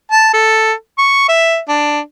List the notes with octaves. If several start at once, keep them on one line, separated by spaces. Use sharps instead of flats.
A5
A4
C#6
E5
D4